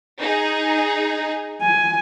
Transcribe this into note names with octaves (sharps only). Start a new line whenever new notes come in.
D#4 G#4
G#5